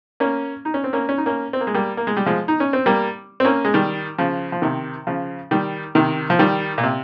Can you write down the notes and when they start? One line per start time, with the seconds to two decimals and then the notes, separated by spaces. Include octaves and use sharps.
0.20 A#3 C#4
0.65 D#4
0.74 C#4
0.84 C4
0.93 A#3 C#4
1.09 C#4
1.18 D#4
1.26 A#3 C#4
1.53 C4
1.61 A#3
1.67 G#3
1.74 G3 A#3
1.97 A#3
2.07 G#3
2.17 G3
2.26 F3 G#3
2.48 D#4
2.60 C#4
2.73 C4
2.86 G3 A#3
3.40 C4
3.45 A#3 C#4
3.65 G#3
3.74 D#3 G3
4.18 C#3 F3
4.52 F3
4.62 C3 D#3
5.07 C#3 F3
5.51 D#3 G3
5.95 C3 D#3
6.30 F3
6.39 D#3 G3
6.78 A#2
6.83 C3